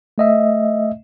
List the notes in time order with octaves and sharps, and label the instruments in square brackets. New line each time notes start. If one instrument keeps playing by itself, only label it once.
[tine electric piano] A3 D#5 E5